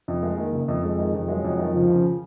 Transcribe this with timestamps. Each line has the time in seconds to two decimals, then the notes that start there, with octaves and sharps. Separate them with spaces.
0.08 F2
0.23 G#3
0.38 D#3 A#3
0.52 F#1
0.68 F2
0.83 F2 G#3
0.99 D#3
1.14 F2
1.28 F#3 G#3
1.44 F2
1.59 D#3
1.74 C#2 F3
1.89 C#3